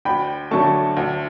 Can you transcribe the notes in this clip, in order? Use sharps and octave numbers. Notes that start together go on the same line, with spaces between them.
D2 G5 B5
D3 F#3 A3 A5 C#6
D2